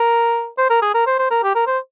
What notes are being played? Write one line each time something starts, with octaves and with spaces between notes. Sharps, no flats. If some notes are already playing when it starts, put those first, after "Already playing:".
Already playing: A#4
C5
A#4
G#4
A#4
C5
C5
A#4
G4
A#4
C5